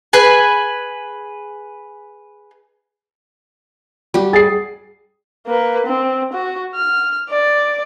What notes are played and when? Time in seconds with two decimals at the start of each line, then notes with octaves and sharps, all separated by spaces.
0.13 G#4 B4 G#5
4.14 G3 F#4 G4
4.33 G#4 A6 C7
5.47 A#3 B4
5.86 C4
6.33 F#4
6.75 F6
7.30 D5